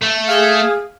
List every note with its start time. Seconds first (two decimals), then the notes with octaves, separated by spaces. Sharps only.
0.02 A3
0.28 G#4 F5